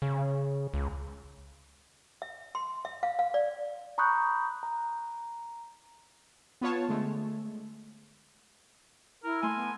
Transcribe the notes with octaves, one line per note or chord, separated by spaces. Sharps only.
C#3
C#2
E5
C6
E5
F5
F5
D5
A#5 B5 C#6 D#6 F#6 G6
A#5
B3 F4 C#5 A5
D3 G#3 A3
E4 A#4
A3 G#5 C6
B3